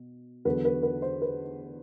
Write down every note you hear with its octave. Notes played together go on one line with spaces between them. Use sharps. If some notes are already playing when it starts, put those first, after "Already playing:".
Already playing: B2
E2 D3 F#3 B4
B4
B4
C5
B4